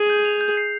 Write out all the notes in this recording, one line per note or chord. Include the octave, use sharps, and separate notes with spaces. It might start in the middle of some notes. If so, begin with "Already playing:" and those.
Already playing: G#4
G6
F7
G6
C7